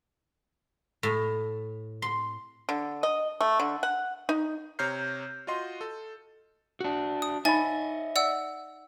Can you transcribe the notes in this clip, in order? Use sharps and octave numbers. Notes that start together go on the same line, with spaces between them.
A2
C6
D3
D#5
A3
D3
F#5
D#4
C3 C#5 A#5 F6 G6 C7
F4 F#4 D#5 C6
A4
D4 F#4
D#6
D#4 C#5 D#5 E5 G#5 B5 A6
D5 F#5 E6